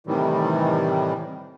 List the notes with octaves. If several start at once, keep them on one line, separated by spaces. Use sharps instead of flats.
A2 C3 D#3 E3 G3